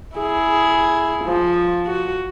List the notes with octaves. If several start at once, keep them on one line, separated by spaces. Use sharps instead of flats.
E4 G#4
F3
F#4